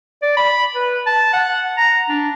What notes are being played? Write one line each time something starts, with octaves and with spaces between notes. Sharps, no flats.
D5
B5
B4
A5
F#5
A#5
D4